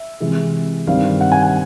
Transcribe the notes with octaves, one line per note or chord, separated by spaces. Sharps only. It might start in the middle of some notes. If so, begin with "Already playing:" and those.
Already playing: E5
C3 E3 G#3
G2 D#3 G3 C4 F5
F#5
G#5
G#5